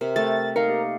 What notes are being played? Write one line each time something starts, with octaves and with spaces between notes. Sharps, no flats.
C3 A#4
A3 A6
D#4 A#4 F5 C#7
A#3 G4